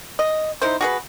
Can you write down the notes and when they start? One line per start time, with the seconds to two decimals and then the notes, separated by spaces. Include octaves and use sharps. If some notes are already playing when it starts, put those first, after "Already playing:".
0.19 D#5
0.62 D#4 E4 C5
0.81 F#4 G#4 B4